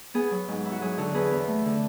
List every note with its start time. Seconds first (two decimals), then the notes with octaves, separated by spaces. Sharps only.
0.14 B3 G#4
0.31 F#3
0.48 G#2
0.65 E4
0.72 F#4
0.81 F#3 G#4
0.98 D3 F#4 A4
1.14 E2 G#4 B4
1.31 E2
1.48 A3
1.65 D3